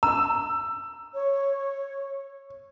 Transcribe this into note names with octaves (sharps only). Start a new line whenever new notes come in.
A#5 E6
C#5